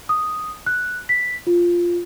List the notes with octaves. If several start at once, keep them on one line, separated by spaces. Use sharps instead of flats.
D#6
F#6
B6
F4